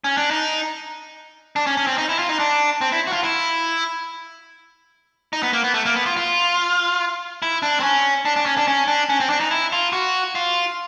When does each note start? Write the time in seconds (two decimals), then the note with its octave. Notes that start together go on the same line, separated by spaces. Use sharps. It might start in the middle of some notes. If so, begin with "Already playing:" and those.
0.04 C#4
0.17 D4
0.31 D#4
1.56 D4
1.67 C#4
1.77 C#4
1.87 C4
1.98 D#4
2.09 E4
2.19 F4
2.29 D#4
2.39 D4
2.81 C4
2.92 E4
3.07 F#4
3.13 F4
3.24 E4
5.33 D#4
5.43 B3
5.53 A#3
5.64 B3
5.74 A3
5.86 A#3
5.96 B3
6.06 F4
6.17 F4
7.42 E4
7.63 D4
7.80 C4
7.83 C#4
8.25 D4
8.36 D4
8.46 C#4
8.57 D4
8.68 C#4
8.88 D4
9.09 C#4
9.20 C4
9.30 D4
9.40 D#4
9.51 E4
9.73 F4
9.93 F#4
10.35 F4